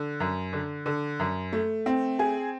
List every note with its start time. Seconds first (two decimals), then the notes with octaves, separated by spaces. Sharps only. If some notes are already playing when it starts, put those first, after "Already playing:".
Already playing: D3
0.20 F#2
0.53 D3
0.86 D3
1.19 F#2
1.53 A3
1.86 C4
2.19 G#4